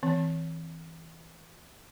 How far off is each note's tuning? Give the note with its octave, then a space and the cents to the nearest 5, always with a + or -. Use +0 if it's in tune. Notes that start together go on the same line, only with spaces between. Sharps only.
E3 -15 C4 +0